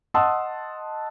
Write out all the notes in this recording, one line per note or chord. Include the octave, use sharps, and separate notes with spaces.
D#5 F#5 A5 C6 D#6 E6